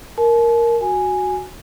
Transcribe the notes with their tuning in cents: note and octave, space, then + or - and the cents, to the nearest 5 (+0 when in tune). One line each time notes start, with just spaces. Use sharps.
A#4 +0 A5 -45
F#4 +0 G#5 +0